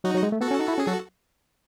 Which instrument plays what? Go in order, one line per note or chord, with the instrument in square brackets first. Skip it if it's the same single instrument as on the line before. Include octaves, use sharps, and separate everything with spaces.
[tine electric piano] F#3 [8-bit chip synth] D#4 F#4
[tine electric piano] F#3
G#3
A3
[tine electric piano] B3 [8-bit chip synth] F#4 A4
[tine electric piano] C#4
D#4
E4
[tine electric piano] C#4 [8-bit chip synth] G#4
[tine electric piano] F#3 [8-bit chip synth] F#4 A4